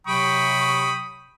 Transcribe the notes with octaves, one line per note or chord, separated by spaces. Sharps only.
C3 F#3 G5 B5 C#6 D#6